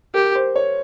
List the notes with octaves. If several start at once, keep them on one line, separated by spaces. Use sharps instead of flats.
G4 A#4
C5
C#5